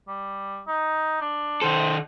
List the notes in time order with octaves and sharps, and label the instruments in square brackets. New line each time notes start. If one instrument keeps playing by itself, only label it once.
[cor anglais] G3
D#4
D4
[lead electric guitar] D#3 A4 [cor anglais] C5